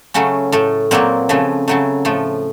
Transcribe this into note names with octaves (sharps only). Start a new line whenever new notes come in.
C#3 F#3 A3 C#4
A2 A3
A#2 F#3 A#3 C4
C#3 F3 A3
C#3 F#3 A3
A2 F3 A3